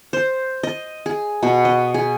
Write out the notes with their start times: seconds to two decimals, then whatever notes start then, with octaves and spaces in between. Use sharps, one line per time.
0.13 C5
0.63 D#5
1.06 G#4
1.43 B2
1.65 D#5
1.94 G#4